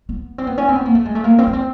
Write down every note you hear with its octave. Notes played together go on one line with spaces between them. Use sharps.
B3
C4
B3
C#4
C4
B3
A#3
A3
G#3
A3
A#3
C4
B3
C4